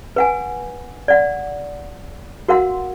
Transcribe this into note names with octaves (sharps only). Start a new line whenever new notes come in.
B4 F#5 G#5
D5 F#5
F#4 A#4 F5 F#5 C6